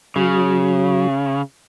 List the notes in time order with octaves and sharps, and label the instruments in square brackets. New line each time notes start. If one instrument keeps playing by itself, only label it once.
[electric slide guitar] C#3 [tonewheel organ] F#3 F#4